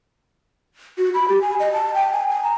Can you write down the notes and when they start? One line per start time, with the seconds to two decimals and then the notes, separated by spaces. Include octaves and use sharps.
0.98 F#4
1.14 B5
1.28 G4
1.41 G#5
1.60 D#5
1.73 A5
1.94 G5
2.12 G#5
2.29 G#5
2.44 A#5